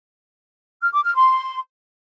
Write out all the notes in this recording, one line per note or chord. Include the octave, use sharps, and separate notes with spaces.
F6
D6
F6
C6